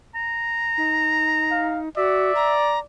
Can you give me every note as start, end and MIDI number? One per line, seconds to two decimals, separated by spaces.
0.15 1.74 82
0.78 1.89 63
1.51 1.79 77
1.97 2.32 66
1.97 2.84 74
1.97 2.54 76
2.35 2.79 82